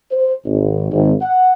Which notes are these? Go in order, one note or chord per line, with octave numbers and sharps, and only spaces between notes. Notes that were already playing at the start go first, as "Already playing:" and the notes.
C5
G#1
G#1
F#5